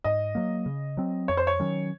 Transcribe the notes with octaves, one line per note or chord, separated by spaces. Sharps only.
G#2 D#5
F#3 A#3
C#3
F#3 C4
F2 C#5
C5
C#5
D#3 F#3 C#4